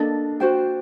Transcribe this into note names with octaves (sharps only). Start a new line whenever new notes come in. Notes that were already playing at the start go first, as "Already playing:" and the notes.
Already playing: A#3 D4 A4 D#5
F#4 C5 G5